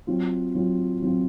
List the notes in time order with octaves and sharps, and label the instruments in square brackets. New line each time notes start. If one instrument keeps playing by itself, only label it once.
[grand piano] F#3 C4 F4
F#3 C4 F4
F#3 C4 F4